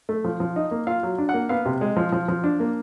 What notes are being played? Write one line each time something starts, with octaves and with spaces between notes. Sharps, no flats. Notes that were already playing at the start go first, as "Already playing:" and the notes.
A3
F3
F3
D#4
A#3
F4 F5
F#3
D4
F#5
A#3
B3 F5
C3
G#3
F3
F3
F3
D4
A#3